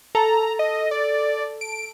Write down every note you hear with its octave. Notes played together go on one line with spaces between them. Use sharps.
A4 A#5
D#5
D5
D7